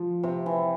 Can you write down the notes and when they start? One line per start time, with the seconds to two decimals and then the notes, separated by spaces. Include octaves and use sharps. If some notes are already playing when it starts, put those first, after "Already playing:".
Already playing: F3
0.23 C3 C4
0.46 E3